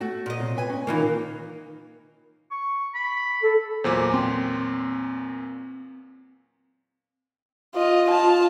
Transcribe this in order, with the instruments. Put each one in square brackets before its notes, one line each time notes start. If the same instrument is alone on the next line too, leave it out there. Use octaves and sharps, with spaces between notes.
[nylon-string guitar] A3 F#4
[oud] A#2 D#5
[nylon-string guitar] C3
B4 G#5
C#4 G#5
[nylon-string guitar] A#2 [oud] D#3 E3 A#3
[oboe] C#6
B5
[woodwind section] A4
[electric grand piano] E2 A#2 F#3 [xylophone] C5 G#5 D6
[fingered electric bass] C4 [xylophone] G5 C6
[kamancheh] F4 D#5
F4 A5